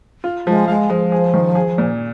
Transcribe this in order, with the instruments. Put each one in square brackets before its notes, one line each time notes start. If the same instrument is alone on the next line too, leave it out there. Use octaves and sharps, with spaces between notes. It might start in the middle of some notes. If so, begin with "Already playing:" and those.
[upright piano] F4
[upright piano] F3 [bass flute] G#3
[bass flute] G#3 [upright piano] F5
[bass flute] F3 [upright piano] G#3
[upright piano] G#4
D#3
G#4
A#2